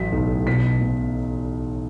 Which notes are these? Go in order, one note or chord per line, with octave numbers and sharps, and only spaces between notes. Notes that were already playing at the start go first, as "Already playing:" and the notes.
Already playing: A1 F#3 B6
B1
B2 B6
B2